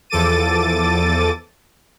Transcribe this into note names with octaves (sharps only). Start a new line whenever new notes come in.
E2 F3 A4 D6 A6 D#7